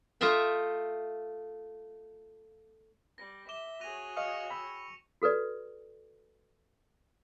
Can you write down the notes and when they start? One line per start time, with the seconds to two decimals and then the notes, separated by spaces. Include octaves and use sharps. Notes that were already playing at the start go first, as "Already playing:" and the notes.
0.21 A3 F4 D#5 E5 G5
3.18 G3 A#6
3.49 E5 D6 E7 G7
3.81 F#4 G#4 C#5 A#6 D#7 F7
4.16 D#5 F5 C#6 D#6 C#7 F7
4.50 G5 B5 E6
5.22 F#4 A4 B4 D5